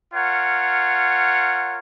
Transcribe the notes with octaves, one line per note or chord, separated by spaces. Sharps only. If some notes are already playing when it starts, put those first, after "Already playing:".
F4 A#4 C#5 F#5